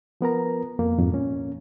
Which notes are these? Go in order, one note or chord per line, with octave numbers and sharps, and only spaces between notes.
F3 B3 A#4 A#5
F2 A#3
F2 G#2
A#2 C#4